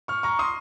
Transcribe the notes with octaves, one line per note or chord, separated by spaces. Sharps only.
C#6 F6
A#5 C#6
C6 D#6